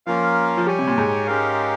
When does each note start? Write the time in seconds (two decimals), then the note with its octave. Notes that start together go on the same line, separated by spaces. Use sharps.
0.06 F3 A#3 C#4 F4 A#4 F5
0.57 F3
0.66 G3 G4 C#5 G#5
0.79 C3
0.87 A#2
0.98 G#2
1.27 G#3 C#4 G4 A#4 F5